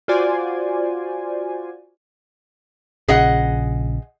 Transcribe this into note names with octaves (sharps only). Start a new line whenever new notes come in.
F4 F#4 C5 D5 G#5
A#1 C#3 G#4 D#5 F#5